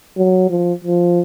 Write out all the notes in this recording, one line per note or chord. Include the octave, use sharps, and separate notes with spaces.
F#3
F3
F3